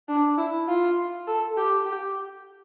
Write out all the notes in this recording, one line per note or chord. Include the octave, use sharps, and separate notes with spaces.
D4
E4
F4
A4
G4
G4